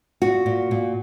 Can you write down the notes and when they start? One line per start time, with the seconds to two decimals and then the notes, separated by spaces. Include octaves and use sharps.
0.22 A#2 F#4
0.46 A#2
0.71 A#2